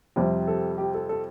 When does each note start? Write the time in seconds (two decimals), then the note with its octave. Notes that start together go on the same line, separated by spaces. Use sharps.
0.16 F2 C3 G3 C4 G4
0.48 A4
0.78 G4
0.94 A4
1.09 A4